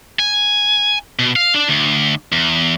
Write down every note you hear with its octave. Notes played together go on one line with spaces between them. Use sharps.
G#5
B2
F5
D4
D2
E2